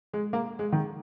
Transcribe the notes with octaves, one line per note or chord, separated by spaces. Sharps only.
G#3
A#3
G#3
D#3